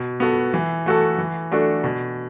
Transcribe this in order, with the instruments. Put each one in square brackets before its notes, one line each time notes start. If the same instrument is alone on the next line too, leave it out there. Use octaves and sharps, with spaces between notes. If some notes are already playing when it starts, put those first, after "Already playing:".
Already playing: [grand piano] B2
B3 F#4 A4
E3
A3 F#4 A4
E3
A3 D4 F#4 A4
B2